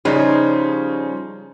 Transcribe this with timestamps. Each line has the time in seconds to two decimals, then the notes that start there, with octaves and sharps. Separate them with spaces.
0.05 C#3 F3 G3 C#4 D#4